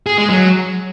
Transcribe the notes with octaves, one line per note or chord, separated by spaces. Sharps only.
G#4
G#3
F#3